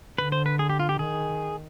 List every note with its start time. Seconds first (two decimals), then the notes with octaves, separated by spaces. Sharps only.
0.18 D3 B4
0.32 C5
0.46 B4
0.59 G#4
0.69 G4
0.80 F4
0.89 G4
0.99 D#3 G#4